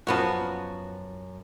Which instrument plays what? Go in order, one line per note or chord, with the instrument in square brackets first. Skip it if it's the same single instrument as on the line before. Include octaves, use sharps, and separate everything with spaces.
[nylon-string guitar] F#2 A4 A5 [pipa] F3 B3 F#4